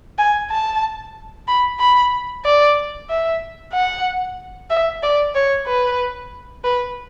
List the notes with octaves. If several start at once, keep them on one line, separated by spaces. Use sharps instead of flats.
G#5
A5
B5
B5
D5
E5
F#5
E5
D5
C#5
B4
B4